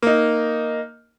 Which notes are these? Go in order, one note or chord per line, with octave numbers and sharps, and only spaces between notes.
A#3 D#4